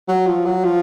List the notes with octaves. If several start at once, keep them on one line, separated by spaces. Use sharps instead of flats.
F#3
F3
F#3
F3